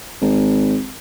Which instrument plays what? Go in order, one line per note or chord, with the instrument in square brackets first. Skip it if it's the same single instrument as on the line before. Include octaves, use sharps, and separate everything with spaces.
[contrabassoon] G#1